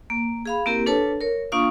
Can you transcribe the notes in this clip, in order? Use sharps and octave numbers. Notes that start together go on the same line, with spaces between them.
A#3
G#4 F5 B5
A#3 C4 E4 G4 A#4
D4 A4 B4 C#5 A5
A#4 C#5
A#3 D4 F4 F5 C#6 D#6